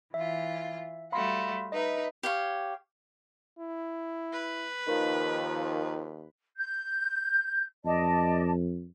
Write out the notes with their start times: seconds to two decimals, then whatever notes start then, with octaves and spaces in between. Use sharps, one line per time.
0.14 E3 F4 E5
1.12 G3 A3 F#4 F5 B5 C6
1.72 D#4 B4 D#5 E5
2.23 G4 C#5 F5
3.59 E4
4.33 B4
4.87 D#2 D#3 F3
6.57 G6
7.85 F2 D5 D#5 A5